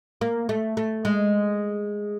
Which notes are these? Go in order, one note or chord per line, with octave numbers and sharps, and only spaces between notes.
A#3
A3
A3
G#3